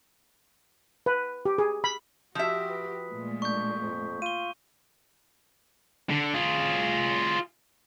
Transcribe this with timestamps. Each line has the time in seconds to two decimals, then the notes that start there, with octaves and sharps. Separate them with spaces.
1.06 B4
1.45 G4
1.58 G#4
1.84 B5
2.35 F3 F#4 G4 E5 D#6 B6
2.69 B4
3.09 A#2 G#3 A3
3.42 D4 C#6 G6
3.82 F2
4.22 F4 D#7 G7
6.10 D3
6.34 F4 G#4